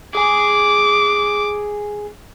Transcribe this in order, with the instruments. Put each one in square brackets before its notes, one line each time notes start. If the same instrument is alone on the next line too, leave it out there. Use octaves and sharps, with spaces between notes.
[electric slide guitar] G#4 G#5 [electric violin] D6